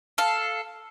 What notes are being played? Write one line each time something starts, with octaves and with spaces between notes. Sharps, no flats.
A4 F5